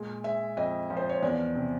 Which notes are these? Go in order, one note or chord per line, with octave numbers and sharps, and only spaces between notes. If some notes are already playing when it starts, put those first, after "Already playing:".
Already playing: A#2 G#3
G#3 E5
F2 D#5
F3
C5
C#5
E2 D5
C3